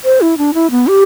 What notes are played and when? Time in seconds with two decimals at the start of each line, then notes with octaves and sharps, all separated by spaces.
0.05 C5
0.21 E4
0.38 D4
0.54 E4
0.71 B3
0.87 G4